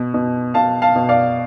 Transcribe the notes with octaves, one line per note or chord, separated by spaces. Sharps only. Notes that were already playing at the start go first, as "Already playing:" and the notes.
Already playing: B2
B2
B2 F5 A5
F5 A5
B2
D5 F5